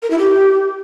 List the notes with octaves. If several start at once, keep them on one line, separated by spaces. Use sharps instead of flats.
A#4
E4
G4